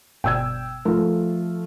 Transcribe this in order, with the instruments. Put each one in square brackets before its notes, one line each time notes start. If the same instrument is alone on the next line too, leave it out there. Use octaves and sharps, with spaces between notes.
[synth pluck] G1 B2 D5 [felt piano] G5 E6 G#6
[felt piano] F3 A3 F4 [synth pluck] A#4